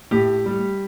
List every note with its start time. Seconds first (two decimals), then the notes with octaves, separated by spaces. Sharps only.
0.11 A2 G4
0.46 G3